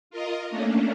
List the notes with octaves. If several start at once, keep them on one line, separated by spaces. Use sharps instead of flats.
F4 A#4 D#5
A3 A#3 C#4 D4